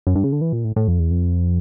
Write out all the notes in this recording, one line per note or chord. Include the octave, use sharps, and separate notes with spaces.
F#2
G2
C#3
D3
E3
A#2
A2
A2
F2
E2
F2